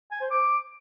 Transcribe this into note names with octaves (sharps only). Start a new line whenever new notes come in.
G#5
C5
D6